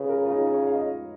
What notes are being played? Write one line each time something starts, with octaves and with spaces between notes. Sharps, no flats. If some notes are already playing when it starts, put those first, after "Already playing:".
Already playing: C#3 F4 B4
A#4
F4
D#4
C#5
F5
D#5